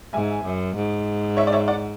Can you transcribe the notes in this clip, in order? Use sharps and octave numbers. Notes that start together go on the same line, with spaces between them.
G#2 E5 G#5
F#2
G#2
C#5 E5
D5
C#5 E5
D5 F#5